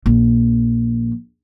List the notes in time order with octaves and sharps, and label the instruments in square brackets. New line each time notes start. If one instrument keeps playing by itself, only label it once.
[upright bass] A#1